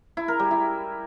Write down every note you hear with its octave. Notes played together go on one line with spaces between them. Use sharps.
E4
A#4
G3
E4